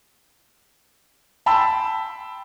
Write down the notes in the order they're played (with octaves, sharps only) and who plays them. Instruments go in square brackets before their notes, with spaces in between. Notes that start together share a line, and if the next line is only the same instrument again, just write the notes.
[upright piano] G5 A5 B5 C6 E6